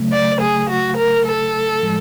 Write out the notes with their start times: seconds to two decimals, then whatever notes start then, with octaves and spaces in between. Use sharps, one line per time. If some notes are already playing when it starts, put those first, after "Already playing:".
Already playing: C#3 F#3 A3
0.13 D5
0.41 G#4
0.70 F#4
0.97 A#4
1.26 A4
1.83 A2 F3 G#3